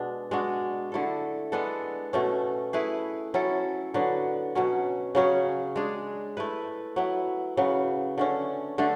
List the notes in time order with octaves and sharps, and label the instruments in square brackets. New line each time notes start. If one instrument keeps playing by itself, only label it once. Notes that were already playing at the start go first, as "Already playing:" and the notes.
Already playing: [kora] B2 G#3 D4
G#3 D4 F#4
D3 A3 E4 A4
G#3 B3 D4 A4
B2 A3 C#4
A3 E4 G#4 B4
F#3 C#4 E4 A4
D3 F#3 B3
B2 F#3 C#4
C#3 F#3 C#4 G#4
G#3 D4 G#4
A3 E4 B4
F#3 B3 E4
C#3 F#3 B3
D3 A3 C#4
D3 A3 D4